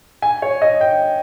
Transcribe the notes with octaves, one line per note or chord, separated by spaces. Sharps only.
G#5
C#5
D#5
G5